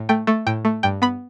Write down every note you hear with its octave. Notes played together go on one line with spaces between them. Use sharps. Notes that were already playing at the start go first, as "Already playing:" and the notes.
Already playing: A2
A3 G5
A3
A2 G5
A3
G2 G5
B3 B5